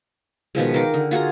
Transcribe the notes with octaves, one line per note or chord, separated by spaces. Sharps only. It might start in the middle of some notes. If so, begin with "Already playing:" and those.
B2 D#3 F3 G#3
D#3 A#4 G5 D6
D3
F4 F#4 G#4 A#5